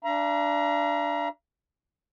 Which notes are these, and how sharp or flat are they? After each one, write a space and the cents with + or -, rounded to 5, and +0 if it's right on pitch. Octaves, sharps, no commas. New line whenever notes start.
D4 +0 F5 -45 A#5 +25